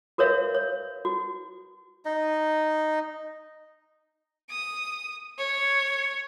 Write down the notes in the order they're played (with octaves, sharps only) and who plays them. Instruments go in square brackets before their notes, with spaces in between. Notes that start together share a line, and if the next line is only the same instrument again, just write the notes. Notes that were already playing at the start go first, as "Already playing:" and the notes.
[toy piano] F#4 A#4 B4 C#5 E5 F5
C#5
F#4
[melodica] D#4 D#5
[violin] D#6
C#5